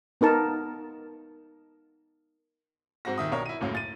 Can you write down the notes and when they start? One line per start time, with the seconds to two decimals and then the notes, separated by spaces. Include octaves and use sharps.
0.21 B3 D#4 A#4 A5
3.05 G#2 C4 F#4 A#6
3.18 D#1 D#3 E5 D#6
3.32 B1 D4 A#4 C#5
3.46 E4 D#7
3.61 C#2 F#2 A2 F#3 A#3
3.75 A6 D#7